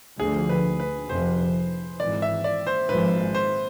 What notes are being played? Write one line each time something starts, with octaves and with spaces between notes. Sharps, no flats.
D2 D3 F3 G#4
B4
B4
F1 F2 C3 F3 C5
G#1 G#2 E3 D5
E5
D5
C5
G#1 G#2 F3 G#3 B4
C5